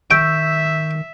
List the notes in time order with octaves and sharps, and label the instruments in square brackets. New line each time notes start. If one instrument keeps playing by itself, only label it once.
[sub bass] D#3 [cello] E5 [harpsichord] G5 [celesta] C#6 E6 G6